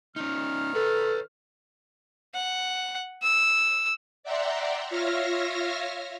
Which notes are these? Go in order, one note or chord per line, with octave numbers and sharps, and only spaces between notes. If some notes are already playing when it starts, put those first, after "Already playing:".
D#3 C#4 D#4 F6
A4 B4 C#5
F#5
E6
D5 E5 F#5 G5 A#5 C6
F4 C#5 E5 F5 F6 A#6